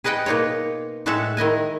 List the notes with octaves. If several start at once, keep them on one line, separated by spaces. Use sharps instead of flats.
G#4 B4 D#5 F#5 G5
B2 A#3 D#4 F4 C#5
A2 G#3 F#4 A4 C#5 E5
D#3 E4 D#5 G#5